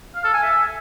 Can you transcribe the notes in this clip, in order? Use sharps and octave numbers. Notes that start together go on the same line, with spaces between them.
F5
A4
G#5
E5